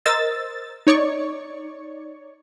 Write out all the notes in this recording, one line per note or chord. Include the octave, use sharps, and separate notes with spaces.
A#4 C5 D#5 E6 A6
D#4 C#5 D5 C#6